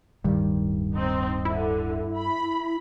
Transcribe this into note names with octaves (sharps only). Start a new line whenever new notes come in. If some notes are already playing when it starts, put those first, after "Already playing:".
D1 G2 D#3 G3
C4 D#4
D3 E4
B5